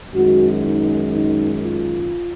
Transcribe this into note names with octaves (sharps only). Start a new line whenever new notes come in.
F#2 D#3 G#3 F#4
D#4
D#4
F4